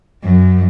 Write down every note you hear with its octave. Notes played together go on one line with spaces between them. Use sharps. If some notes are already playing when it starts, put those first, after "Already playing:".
F#2